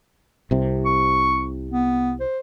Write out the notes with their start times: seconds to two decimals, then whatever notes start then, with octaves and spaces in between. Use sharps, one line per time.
0.51 C2 C3
0.86 C#6
1.71 B3
2.20 C5